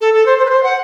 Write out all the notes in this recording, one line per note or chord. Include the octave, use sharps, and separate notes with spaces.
A4
A4
C5
C5
B4
C5
F#5